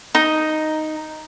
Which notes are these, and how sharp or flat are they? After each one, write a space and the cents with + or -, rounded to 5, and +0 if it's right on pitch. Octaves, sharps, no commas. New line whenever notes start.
D#4 +0